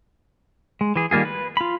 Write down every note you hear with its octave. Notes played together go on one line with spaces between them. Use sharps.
G#3
E3 G#4
D#3 G3 A#3 F4 G#4
B4
F4 B5